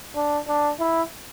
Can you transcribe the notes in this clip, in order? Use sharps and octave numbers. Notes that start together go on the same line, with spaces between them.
D4
D4
E4